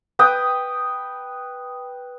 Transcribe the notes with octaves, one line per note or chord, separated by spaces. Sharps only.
B4 G5 D#6